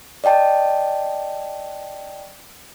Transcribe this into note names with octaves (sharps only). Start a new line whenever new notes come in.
D5 D#5 G5 A5